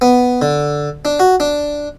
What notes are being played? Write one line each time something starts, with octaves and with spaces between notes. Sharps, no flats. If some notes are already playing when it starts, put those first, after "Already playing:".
B3
D3
D4
F#4
D4